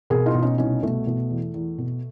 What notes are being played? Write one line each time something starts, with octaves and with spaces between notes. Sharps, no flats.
B2 G#4 A#4
D#4 F4
B2
C#4 D#4
C2 C#4 D#4
B2 A3
B2
E2
E2
B2